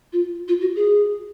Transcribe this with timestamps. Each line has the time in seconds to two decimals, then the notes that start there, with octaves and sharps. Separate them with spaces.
0.13 F4
0.48 F4
0.61 F#4
0.76 G#4